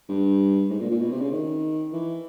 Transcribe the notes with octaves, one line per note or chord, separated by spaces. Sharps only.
G2
G#2
A#2
A#2
B2
C3
C#3
D#3
E3